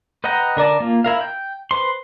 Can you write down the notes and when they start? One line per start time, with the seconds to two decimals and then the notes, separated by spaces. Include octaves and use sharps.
0.24 B4 D#5 F#5 G5 A#5
0.57 D3 A#4 D5 A5
0.80 A#3 F4
1.04 E4 A#4 F5
1.21 G5
1.71 B4 C5 C6